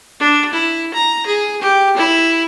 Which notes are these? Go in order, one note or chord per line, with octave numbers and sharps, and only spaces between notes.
D4
E4
A#5
G#4
G4
E4